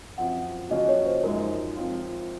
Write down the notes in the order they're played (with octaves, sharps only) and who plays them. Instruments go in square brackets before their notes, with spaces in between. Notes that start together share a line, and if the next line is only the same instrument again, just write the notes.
[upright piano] F#2 F3 C4 [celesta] F#5
[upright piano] C#3 F3 A#3 C#4 F#4 [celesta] D#5
[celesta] C#5
C5
[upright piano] F#2 F3 G#3 D#4 [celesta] A#4
[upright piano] F3 C4 F4